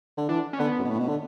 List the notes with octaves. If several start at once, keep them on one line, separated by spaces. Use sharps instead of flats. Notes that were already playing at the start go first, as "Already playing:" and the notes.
D3
E3 D4
C#4
D3 B3
F#2
B2
A2
B2
D3